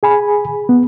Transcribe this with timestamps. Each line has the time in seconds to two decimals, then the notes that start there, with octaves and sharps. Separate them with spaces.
0.03 G#4 G#5 B5
0.69 B3